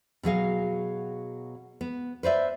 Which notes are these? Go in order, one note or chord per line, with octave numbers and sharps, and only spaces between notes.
B2 F#3 G#4 F5
B3
B4 C5 D5 E5